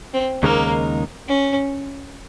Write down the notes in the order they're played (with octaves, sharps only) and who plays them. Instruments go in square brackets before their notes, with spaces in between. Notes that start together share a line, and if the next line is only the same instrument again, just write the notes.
[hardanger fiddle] C4
[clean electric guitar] D#2 C#3 G#3 D#4 A#4 [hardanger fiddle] A#3
[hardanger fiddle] C#4